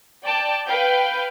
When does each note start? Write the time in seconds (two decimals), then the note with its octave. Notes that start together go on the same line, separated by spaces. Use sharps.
0.24 D5 G5 A5 D6
0.66 B4 F5 G5 G6